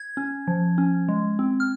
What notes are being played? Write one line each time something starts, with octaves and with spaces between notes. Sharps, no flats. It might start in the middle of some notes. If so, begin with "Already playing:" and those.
Already playing: G#6
C#4
F3
C#4
G#3
C4
F6